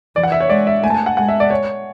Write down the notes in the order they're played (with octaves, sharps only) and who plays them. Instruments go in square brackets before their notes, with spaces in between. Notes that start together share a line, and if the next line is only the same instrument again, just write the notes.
[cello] E3 [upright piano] D5
[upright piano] F#5
E5
C#5
[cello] G#3 [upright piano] D5
[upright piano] E5
[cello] A3 [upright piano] G#5
[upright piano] A5
G#5
F#5
[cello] G#3 [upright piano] F#5
[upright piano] E5
D5
C#5